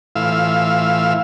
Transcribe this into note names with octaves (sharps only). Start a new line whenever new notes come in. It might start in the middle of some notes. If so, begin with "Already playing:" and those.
A2 E3 F4 F5 E6